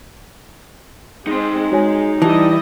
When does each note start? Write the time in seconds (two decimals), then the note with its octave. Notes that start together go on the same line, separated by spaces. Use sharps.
1.27 G#3 C4 D#4 C6
1.72 G#3 F#4 C#5 G#5
2.22 E3 G3 E4 D#5 A5